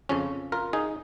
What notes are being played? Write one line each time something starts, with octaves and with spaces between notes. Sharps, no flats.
F2 C#3 F3 C#4
F4 A#4
D#4 G#4